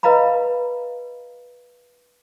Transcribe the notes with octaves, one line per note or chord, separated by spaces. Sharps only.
B4 D#5 F5 A#5 B5